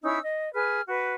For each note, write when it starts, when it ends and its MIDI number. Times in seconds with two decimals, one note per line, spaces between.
0.03 0.19 61
0.03 0.19 63
0.03 0.19 64
0.03 0.19 88
0.24 0.51 75
0.54 0.81 68
0.54 0.81 71
0.54 0.81 89
0.87 1.16 66
0.87 1.16 71